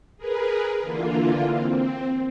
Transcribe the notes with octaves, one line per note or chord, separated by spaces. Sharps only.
G#4 A#4 B4
D3 E3 A#3 F4
C4